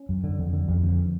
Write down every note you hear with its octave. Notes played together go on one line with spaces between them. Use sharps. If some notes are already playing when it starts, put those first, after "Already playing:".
Already playing: C#4
F#2
D3
F2
D3
F2
D3